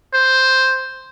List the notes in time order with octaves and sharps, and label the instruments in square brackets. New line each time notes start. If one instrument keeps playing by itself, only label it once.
[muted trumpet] C5